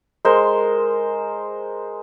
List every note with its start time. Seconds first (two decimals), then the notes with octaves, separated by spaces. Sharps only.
0.25 G#3 A#4 C5